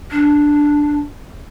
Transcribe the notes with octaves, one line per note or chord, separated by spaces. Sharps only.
D4